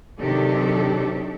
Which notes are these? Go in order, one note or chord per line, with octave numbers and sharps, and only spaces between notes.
C3 D#3 F#3 D4 G4 A4